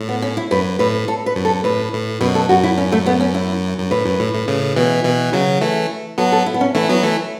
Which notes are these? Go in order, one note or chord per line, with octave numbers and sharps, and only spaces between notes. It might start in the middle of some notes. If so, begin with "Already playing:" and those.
Already playing: A2
B3
C#4
E4
F#2 B4
A2 B4
A4
B4
F#2
A4
A2 B4
A2
F#2 B2 B4
A4
F#2 F#4
E4
C#4
A3
B3
C#4
E4
F#2
A2 B4
F#2
A2
A2
A2 C#3
B2 E3
B2 E3
C#3 F#3
E3 A3
F#3 B3 A4
A4
E4
B3
C#4
E3 A3 E4
F#3 B3
E3 A3